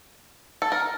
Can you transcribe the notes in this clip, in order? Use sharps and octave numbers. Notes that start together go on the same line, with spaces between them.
A4
A#4